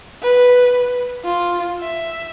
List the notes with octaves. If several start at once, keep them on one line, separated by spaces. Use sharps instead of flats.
B4
F4
E5